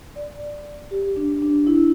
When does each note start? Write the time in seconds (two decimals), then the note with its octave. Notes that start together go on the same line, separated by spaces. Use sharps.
0.16 D5
0.91 G4
1.16 D4
1.42 D4
1.67 E4